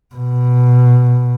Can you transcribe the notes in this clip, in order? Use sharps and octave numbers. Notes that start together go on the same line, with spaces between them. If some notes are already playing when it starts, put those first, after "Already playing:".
B2